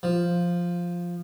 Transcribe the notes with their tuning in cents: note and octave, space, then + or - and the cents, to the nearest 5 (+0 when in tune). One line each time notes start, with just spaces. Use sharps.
F3 +0